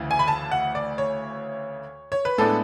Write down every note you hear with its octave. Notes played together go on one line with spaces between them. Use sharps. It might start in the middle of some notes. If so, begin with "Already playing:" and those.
Already playing: D2 C#3 E3
G#5
B5
A5
F#5
D5
C#5
C#5
B4
A2 G#3 B3 D4 A4